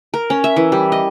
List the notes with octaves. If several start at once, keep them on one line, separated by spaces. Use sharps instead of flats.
A#4
C#4
E5
E3
G3
D#5